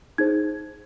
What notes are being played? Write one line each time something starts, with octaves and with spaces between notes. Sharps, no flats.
D#4 G#4 C5 G#6